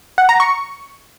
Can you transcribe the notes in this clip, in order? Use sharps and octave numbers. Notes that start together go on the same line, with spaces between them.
F#5
A#5
C#6